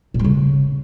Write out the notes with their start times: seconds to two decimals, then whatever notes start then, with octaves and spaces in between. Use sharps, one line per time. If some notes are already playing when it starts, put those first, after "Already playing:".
0.14 A#2
0.19 G3
0.24 C#3